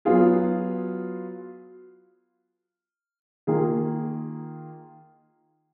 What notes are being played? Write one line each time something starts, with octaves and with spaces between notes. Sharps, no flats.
F#3 B3 F4 G#4
D#3 A#3 F4 G#4